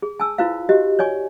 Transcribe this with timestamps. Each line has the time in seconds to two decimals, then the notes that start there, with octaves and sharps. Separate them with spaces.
0.02 G#4
0.20 G#5 A5 E6
0.38 E4 F4 B4 C5 F5
0.69 F#4 G4 C5 D#5
0.99 C#5 D5 G#5 C#6